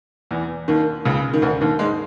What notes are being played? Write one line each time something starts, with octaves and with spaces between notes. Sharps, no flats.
E2 E3
D#2 D#3
C#2 C#3
D#3
D2 D3
D#2 D#3
G#2 G#3